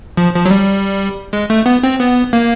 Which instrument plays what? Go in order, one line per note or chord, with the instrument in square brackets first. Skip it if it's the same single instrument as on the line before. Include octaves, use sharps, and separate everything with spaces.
[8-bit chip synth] F3
F3
F#3
G3
G#3
A3
B3
C4
B3
A#3